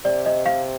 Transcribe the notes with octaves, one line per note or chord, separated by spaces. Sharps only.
C3 D5
D#5
F5